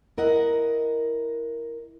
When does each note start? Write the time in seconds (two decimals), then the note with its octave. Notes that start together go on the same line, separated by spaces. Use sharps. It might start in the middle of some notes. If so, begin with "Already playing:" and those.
0.18 E4 A#4 D#5 F#5